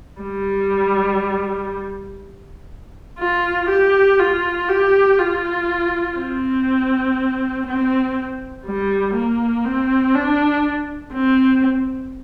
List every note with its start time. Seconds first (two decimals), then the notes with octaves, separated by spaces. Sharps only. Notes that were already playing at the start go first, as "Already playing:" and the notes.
0.22 G3
3.19 F4
3.69 G4
4.19 F4
4.69 G4
5.19 F4
6.18 C4
7.67 C4
8.66 G3
9.15 A#3
9.65 C4
10.15 D4
11.14 C4